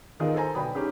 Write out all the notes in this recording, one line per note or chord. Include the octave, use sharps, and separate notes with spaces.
D#3 B3 F4 G#4 A#4 D#5
A4 A#4 C5 G#5 A#5
B1 D3 B4 G5 B5 D#6
C#4 D#4 G4 G#4 G5